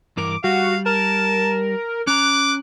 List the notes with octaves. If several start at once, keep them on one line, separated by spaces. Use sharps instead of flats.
G2 E3 A#4 D6
G3 F#4 F5
A#4 A5
C#4 A#5 D6 F#6